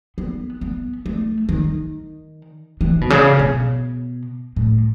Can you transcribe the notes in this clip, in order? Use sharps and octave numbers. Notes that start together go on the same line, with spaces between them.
B3
B3
A3
D#3
E3
B2
C#3
B2
A2